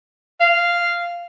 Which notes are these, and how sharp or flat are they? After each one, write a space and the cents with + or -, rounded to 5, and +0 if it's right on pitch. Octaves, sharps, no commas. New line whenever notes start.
F5 -10